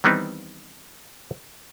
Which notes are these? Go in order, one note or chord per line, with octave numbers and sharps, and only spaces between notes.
D#3 E3 G3 B3 C4 D#4